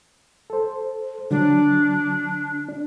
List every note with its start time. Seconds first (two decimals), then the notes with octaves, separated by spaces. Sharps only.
0.50 A4 C5
1.31 D3 F#3 D4
2.69 D4